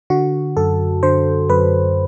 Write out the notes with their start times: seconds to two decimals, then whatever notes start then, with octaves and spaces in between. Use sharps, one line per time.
0.10 D3 F#4
0.57 F#2 A4
1.03 D3 C5
1.50 F#2 B4